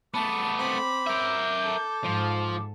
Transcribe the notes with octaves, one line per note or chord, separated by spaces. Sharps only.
A3 B3 A5 D6
C4 B5
A#4 E5 G6
A4
G#2 F3